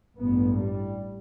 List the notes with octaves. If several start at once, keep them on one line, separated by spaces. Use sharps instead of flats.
A1 G2 B3
G3